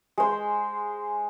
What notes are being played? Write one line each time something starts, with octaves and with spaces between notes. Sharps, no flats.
G#3 C5